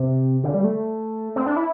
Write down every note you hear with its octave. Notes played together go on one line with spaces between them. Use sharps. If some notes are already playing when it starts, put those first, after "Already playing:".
Already playing: C3
D3
G3
A3
C4
D4
E4